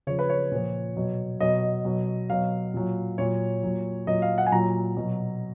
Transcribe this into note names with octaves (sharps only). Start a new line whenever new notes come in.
C#3 F3 C#5
B4
C#5
A#2 F3
B2 F#3
B2 F#3 D#5
B2 F#3
B2 F#3 F5
A#2 F#3
A#2 F#3 C#5
A#2 F#3
A#2 F#3 D#5
F5
F#5
G#5
A#2 F#3 A#5
B2 F#3